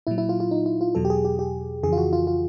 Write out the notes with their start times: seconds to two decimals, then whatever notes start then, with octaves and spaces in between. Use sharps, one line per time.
0.07 A#2 F#3 E4
0.18 E4
0.29 F4
0.40 F4
0.51 D#4
0.66 E4
0.81 F4
0.95 E2 B2 F#3 A4
1.05 G4
1.10 G#4
1.25 G4
1.39 G4
1.83 F2 C#3 E3 G#4
1.93 F4
1.98 F#4
2.13 F4
2.27 F4